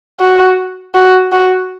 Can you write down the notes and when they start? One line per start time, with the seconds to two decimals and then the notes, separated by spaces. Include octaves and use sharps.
0.20 F#4
0.94 F#4
1.32 F#4